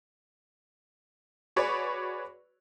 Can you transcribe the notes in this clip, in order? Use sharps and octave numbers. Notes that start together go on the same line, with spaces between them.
F#4 G#4 B4 C#5 D5 C#6